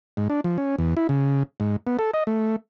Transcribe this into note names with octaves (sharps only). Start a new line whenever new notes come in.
G#2
D4
F3
C#4
E2
E4
C#3
G#2
B3
A4
D#5
A3